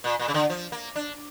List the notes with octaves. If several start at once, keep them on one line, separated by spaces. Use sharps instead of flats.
A#2
A#2
C#3
D3
F3
A#3
D4